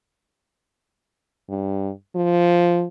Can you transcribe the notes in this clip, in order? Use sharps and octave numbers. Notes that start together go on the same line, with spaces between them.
G2
F3